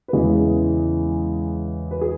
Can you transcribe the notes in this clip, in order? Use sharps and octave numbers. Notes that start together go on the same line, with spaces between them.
B4
E2 C#3 E3 G#3 G#4
B4
G#4